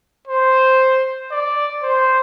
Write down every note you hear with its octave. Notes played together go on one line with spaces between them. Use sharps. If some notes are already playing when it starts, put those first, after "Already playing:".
C5
D5
C5